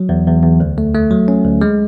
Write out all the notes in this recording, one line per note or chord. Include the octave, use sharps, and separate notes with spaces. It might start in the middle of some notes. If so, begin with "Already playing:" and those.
Already playing: F#3
E2
E2
E2
D2
A3
A3
F#3
C#4
D2
G#3